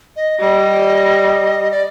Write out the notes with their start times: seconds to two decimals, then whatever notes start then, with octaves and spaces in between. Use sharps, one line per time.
0.16 D#5
0.40 G3 D#5
1.71 D5